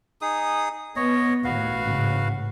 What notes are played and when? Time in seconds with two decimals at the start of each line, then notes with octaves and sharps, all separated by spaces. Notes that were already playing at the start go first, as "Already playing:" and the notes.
0.22 D#4 G#4 D#6
0.96 B3 C#5 D#5
1.44 D#2 A2 F#4 B4 F5
1.78 A1 G#2 C#3